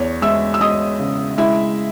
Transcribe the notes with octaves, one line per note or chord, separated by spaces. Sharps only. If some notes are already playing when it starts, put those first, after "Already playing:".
Already playing: E2 C#5
G#3 E5 E6
E6
G#3 D#5 D#6
C#3
G#3 E4 E5